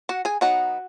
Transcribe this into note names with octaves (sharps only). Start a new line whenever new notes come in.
F#4 F#5
G#4 G#5
F#3 B3 D#4 F#4 F#5